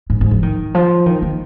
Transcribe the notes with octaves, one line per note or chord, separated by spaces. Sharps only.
G#2
G#2
F3
D#3
F3
D#3
D#3